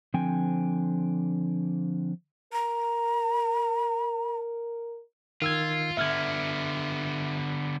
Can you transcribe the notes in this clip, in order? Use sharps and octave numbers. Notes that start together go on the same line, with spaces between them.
D3 F3 C4 G5 G#5
A#4 A#5
D#3 F4 E6 G#6
D3 B3 E5 F6 G#6